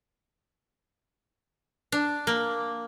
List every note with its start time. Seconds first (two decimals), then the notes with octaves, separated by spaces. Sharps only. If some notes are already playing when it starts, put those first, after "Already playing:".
1.92 D4
2.27 A#3